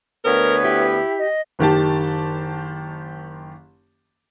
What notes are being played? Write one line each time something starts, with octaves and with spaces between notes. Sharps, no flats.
D2 B3 A#4 C#5
E4 G4
D#5
F#1 D#3 G4 A5